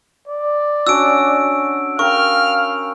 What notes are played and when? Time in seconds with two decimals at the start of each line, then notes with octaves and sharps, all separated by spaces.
0.28 D5
0.87 C#4 D4 F#4 E6 D7
1.99 A#4 F5 G5 C#6 F6